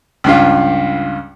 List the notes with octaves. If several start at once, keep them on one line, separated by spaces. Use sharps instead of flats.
C#2 G2 F4